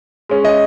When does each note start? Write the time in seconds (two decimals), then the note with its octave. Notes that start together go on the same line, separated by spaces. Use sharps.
0.29 G#3 C#4
0.45 D#5